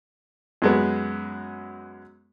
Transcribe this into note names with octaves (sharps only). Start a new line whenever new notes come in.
F#2 G#3 B3